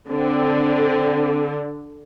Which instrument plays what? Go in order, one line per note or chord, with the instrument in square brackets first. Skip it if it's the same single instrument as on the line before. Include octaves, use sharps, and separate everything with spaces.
[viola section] D3 [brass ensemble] C4